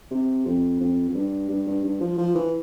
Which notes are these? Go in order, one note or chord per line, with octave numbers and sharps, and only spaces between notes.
C3
F2
F2
F2
G2
G2
G2
G2
F3
F3
E3